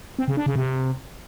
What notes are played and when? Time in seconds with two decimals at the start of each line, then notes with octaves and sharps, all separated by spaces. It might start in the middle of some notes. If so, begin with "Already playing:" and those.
0.19 C4
0.28 C#3
0.37 D4
0.46 C#3
0.55 C3